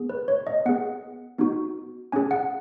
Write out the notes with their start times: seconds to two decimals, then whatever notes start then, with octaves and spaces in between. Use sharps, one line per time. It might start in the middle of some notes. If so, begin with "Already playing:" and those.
Already playing: B3 G#4
0.09 B4
0.28 C#5
0.47 D#5
0.66 B3 G#4 F#5
1.38 B3 D#4 F#4
2.12 C#4 G#4 G#5
2.31 F#5